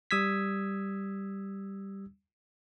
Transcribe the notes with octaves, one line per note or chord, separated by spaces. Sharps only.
G3 D#6 E6 G#6 B6